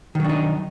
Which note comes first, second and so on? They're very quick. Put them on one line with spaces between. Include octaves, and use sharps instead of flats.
D#3 F#3 D4 D#4